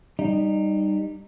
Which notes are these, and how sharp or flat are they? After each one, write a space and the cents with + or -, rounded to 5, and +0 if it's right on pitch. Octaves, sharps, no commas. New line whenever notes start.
G3 +0 D#4 -20